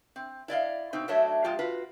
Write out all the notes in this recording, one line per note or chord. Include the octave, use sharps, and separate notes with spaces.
C4
E4 D5 D#5 F5
B2 C4 D#4
F#3 A3 D4 C#5 D#5 E5
F3 G#3 F4 G4
F4 F#4 B4